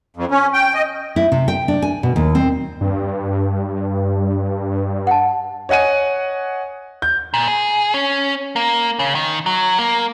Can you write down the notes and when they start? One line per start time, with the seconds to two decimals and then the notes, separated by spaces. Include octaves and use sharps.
0.17 F2
0.31 C#4
0.54 G5
0.75 D#5
1.16 E4
1.32 C3
1.48 G5
1.68 D4
1.82 G#5
2.03 B2
2.16 D#2
2.35 C4
2.81 G2
5.07 F#5 A5
5.69 C#5 D#5 F#5 G#5 D#7
7.02 G6
7.34 A#2
7.48 G#4
7.94 C#4
8.56 A#3
8.99 C#3
9.15 D#3
9.46 F#3
9.79 A#3